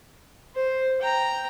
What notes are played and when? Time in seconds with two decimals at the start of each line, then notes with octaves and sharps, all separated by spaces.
0.55 C5
1.01 G5 A#5